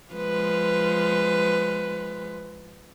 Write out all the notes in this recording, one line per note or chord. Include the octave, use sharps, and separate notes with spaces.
F3 G#3 B4